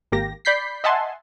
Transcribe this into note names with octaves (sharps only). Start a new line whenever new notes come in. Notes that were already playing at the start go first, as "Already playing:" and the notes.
G#1 A#3 G4 A#6
D5 B5 G6 B6 C7
D#5 E5 F#5 G#5 A5 C6